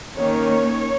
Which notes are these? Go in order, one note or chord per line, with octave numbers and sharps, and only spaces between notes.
D#3 A#3 C#4 C#5